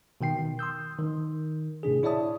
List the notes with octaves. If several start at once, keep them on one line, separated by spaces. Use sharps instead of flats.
B2 D#3 G5 C7
D#3
C6 D#6 E6 G6
D#3
A2 C3 D4 G#4
E4 C#5 D5 E5 A5 D#6